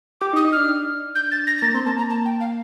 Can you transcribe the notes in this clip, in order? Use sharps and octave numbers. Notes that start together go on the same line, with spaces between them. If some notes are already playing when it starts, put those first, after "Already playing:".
G4 D6
D#4
D#6
D#4
D4 F6
G6
A6
A#6
A#6
A#3 A6
C4 C6
A#3 A5
A#5
A5
G5
F5